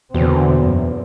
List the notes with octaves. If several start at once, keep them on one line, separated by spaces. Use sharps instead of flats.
E2 B2 D3 A#3 C4
F#2